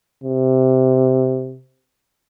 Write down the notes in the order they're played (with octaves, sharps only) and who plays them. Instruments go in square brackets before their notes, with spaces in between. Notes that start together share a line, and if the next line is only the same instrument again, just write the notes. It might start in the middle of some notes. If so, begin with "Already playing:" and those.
[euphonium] C3